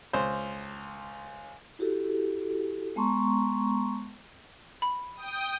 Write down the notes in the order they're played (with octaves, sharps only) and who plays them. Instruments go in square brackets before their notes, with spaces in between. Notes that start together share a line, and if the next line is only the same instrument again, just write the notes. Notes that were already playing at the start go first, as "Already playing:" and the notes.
[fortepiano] C#2 C5
[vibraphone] E4 F#4 G4 A4
G#3 B3 A5 A#5 C6 C#6
[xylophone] B5
[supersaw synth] G5 D#6